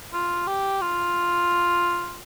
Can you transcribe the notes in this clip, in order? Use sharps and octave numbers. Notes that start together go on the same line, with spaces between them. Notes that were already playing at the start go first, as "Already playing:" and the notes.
F4
G4
F4